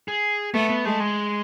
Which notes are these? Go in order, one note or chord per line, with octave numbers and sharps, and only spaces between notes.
G#4
A3 B3
B3
G#3 A3
G#3